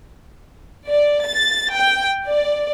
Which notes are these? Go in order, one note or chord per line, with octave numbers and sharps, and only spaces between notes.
D5
A6
G5
D5